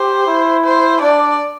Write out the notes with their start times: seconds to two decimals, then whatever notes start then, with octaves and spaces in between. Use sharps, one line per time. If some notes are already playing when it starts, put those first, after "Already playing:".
Already playing: G4 C5
0.27 E4
0.64 C5
1.01 D4 D5